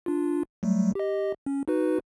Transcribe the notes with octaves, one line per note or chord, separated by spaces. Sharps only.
D4 F4
F#3 G3 A3
G4 D#5
C#4
D#4 F#4 B4